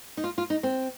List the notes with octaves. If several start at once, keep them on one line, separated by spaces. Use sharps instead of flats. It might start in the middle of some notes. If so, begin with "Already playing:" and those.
D#4
F4
F4
D#4
C4